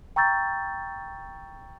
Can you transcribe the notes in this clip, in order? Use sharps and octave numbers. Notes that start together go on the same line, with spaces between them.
G5 A#5 C#6 E6 G6 A6